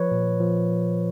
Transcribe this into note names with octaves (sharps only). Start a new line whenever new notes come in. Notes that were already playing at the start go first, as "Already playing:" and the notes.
Already playing: F3 B4 C#5
A#2
F3